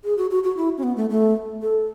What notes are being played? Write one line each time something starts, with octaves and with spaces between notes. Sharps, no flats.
G#4
F#4
F#4
F#4
E4
C#4
B3
A3
A3
A4